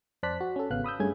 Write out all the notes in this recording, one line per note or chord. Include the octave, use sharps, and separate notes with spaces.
F2 C5 D5 A5 F#6 B6
F#4
C#4 A4
G#1 C#3 B3 F5 F#6
B5 D#6 E6 G6
G2 A3 C#4 G#4 G#6